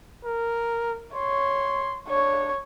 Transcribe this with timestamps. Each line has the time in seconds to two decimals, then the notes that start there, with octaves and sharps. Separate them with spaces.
0.24 A#4
1.15 C#5 C6
2.09 D4 C#5